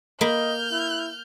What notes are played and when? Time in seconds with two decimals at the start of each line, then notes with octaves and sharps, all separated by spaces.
0.21 A#3 D#5 B5 F6 G6
0.72 E4